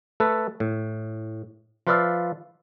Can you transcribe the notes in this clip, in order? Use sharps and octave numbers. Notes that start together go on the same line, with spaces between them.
A3 A4 B4
A2
F3 F4 B4 D5 E5 F5